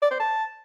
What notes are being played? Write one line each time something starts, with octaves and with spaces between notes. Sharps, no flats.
D5
C5
A5